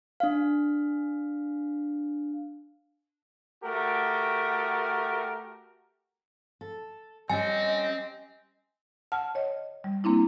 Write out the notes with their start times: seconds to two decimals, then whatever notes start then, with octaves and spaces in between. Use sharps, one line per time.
0.20 D4 F5
3.63 A3 F#4 G4 A#4
6.61 A4
7.30 G3 C4 C#4 G4 D#5 G#5
9.12 F#5 A5 F6
9.35 C#5 D#5
9.84 G3
10.04 A#3 C4 D4 E4